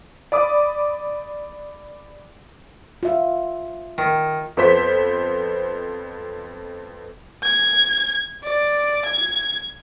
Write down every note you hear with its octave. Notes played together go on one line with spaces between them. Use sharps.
D5 B5 D6 D#6
F4 E5
D#3
F2 B3 C5 B6
G#6
D5
G#6